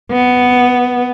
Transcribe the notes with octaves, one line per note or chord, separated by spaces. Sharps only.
B3